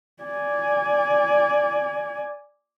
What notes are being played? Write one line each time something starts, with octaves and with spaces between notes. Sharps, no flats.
D5 G#5